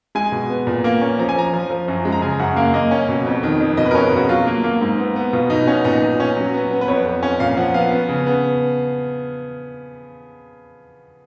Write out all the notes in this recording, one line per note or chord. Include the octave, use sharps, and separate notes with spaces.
G#3 G#5
B2
B3
A#2
A#3
C#4
F3 A#5
G#5
F3 A#5
F3
F3
F#2
G#3
A#5
C#3 G#5
F#2 F#5
A#3 F5
A#3 D#5
C#4
B2
F2
D#3
F2
B2 D#5
B4
A#4
C#4
G#4
B2 F#4
F#3 F4
A#3
A#3
G#2
B3
B3
B2 F4
B2 D#4
B3 C#4
A#2 D#4
A#2
C#4
F#3
B3
B3
B4
F2 C#5
F2
C#4
A#2 F5
F3 F#5
B3 F5
B3
C#3
B3